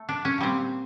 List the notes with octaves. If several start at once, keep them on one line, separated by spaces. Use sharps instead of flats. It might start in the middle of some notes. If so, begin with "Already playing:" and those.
Already playing: A3
D4
C#4
A#2 G3 C4